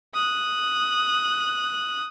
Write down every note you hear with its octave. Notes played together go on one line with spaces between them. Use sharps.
D#6 F#6